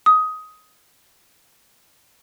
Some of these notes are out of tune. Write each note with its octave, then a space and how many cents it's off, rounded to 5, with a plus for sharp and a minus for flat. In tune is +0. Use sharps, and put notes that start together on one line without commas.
D#6 +15